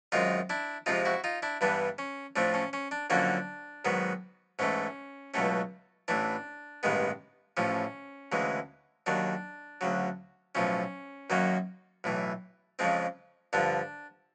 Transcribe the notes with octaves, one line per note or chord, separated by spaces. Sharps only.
F#2 D#3 G#3 C4 D#4 F4
D4 E4
F2 C3 F3 G#3 C4 D#4 F4
E4 F#4
D#4 F4
D4 E4
G2 E3 G3 B3 D4
C#4
A2 F3 A3 C4 D4
C#4
C#4
D4
F2 D3 F#3 A#3 C#4 D4
G#2 D#3 F#3 B3
G#2 E3 A3 C#4
C#2 B2 F#3 A3 C#4
A1 A2 E3 D4
A1 G2 D#3 G#3 B3
A1 A2 F3 C#4
D2 C#3 E3 G#3
D#2 D#3 F#3 D4
D2 C#3 F#3
B1 A2 F3 C#4
F#2 D#3 F#3 A#3 C#4
B1 A2 E3
F2 C#3 F3 G#3 C4
G2 D3 F3 D4